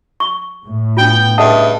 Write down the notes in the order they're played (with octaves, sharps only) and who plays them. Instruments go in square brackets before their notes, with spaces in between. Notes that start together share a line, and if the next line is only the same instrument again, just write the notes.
[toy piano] C#6
[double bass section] A2
[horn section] B3 G5 [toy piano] D4 F4
[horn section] G2 C#3 [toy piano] A4 D#5 F#5 [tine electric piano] E5 A5 D#6